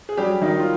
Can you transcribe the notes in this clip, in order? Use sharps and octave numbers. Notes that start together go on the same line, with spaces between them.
G#4
F#3 G3 G4
D#3 F#3 D#4
F4